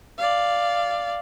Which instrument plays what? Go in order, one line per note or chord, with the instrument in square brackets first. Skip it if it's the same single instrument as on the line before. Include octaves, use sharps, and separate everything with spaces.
[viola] D5 F5